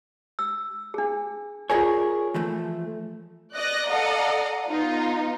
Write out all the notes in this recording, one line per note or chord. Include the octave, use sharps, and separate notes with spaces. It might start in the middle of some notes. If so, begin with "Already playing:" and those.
E6
D4 G#4
F4 G#4 A#4 C#5 D5 G#5
E3 F3 A3
D5 D#5 F#6 A#6
A4 D5 D#5 F5 F#5 A#5
B3 D#4 F4